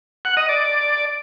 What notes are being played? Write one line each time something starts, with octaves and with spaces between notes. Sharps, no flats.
F#5
D#5
D5